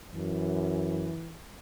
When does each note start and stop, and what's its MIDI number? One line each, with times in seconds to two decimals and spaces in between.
0.15 1.11 42
0.15 1.40 52